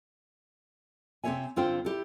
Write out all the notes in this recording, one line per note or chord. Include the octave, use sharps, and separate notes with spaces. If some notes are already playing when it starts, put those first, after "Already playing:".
C3 C4 F#4 C#5 E5 G#5
G2 D3 C4 F4 C5 G5
E4 G4 A4